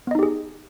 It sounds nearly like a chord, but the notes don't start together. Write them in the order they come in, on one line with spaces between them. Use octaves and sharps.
B3 D#5 D#4 G4 G#4